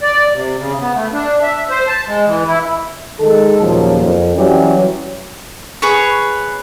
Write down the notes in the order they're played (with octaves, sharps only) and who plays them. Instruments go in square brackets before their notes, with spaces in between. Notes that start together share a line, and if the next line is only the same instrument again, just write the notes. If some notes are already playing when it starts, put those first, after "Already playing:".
[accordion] D5
C3
C#3
B3
A3
D4
E5
C5
A5
G#3
E3
E4
[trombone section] D#3 G#3 A4
D#2 A#2 C#3 F3 F#3
F2
E3 F#3 G3 C#4 G4
[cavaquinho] G#4 B4 C#5